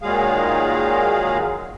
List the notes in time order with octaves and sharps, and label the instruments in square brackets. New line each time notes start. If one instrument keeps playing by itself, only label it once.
[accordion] A#2 D#3 F#3 G#3 G#4 F5